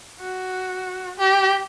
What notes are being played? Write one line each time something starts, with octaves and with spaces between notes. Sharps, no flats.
F#4
G4